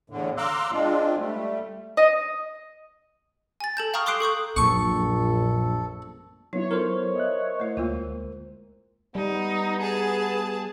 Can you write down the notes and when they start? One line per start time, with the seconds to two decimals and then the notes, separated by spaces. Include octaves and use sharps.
0.10 E2 A2 D3
0.37 F5 A#5 C6 D6 E6 F#6
0.72 G#3 C4 D4 F4
1.18 G3 A3
1.97 D#5
3.60 G#5 A6
3.77 A4 A5 G6
3.94 F5 G5 A#5 C#6 D#6 F6
4.06 C6 D6 D#6 F#6 C7 D7
4.20 A4 C#6 D#6 G6
4.56 A#1 F#2 A#2 A4 C#6
6.53 F#3 B3 D#4 E4 C#5
6.71 F4 A4 A#4 C5
7.16 D#5 E5 F#6
7.60 A3 E4
7.77 D2 G#3 A#3 F4
9.15 G3 B3 D#4
9.81 G#4 A5